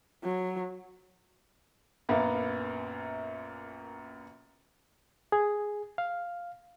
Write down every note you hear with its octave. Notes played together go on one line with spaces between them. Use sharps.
F#3
A#1 F#2 A#3 B3
G#4
F5